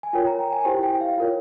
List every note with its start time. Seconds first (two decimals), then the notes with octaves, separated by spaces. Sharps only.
0.03 G#5
0.13 F4 A#4 C#5 G5
0.27 A#5
0.39 G5
0.53 G#5
0.65 E4 G4 C5 G5
0.83 G5
1.01 F5
1.18 F4 A#4 C#5